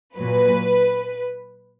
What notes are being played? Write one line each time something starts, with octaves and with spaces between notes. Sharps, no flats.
A#2 F#3 B4